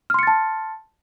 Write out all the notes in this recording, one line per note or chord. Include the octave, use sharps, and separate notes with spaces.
A5 C6 F6 A6 C#7